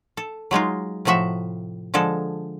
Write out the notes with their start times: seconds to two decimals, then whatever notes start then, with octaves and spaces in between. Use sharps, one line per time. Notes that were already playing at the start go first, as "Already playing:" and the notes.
0.17 A4
0.51 F#3 G#3 D#4 F4
1.05 A2 C3 F3 F#4 E5
1.94 D3 F3 G#3 A4